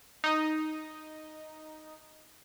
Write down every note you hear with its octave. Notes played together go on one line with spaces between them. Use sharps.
D#4 D#5